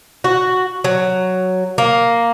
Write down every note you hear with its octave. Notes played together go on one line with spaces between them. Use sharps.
F#4
F#3
A#3